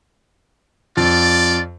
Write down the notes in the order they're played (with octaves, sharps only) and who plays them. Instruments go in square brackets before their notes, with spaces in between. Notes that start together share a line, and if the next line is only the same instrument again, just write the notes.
[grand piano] F2 [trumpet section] F4 D5